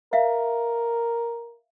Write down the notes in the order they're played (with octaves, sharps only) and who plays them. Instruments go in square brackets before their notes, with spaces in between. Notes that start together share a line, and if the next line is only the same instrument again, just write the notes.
[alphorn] A#4 [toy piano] E5 F5